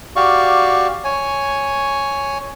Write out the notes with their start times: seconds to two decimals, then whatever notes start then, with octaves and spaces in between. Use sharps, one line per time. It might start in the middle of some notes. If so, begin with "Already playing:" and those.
0.16 F#4 G4 D5 F5 C#6
1.04 C#5 G#5